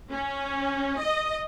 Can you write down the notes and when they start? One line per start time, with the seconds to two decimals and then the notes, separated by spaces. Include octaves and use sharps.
0.12 C#4
1.00 D#5